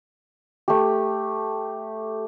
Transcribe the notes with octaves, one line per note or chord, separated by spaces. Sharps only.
A3 G4